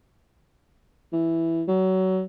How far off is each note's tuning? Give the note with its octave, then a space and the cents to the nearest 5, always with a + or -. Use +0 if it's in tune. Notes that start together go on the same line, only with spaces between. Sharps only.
E3 +0
F#3 +25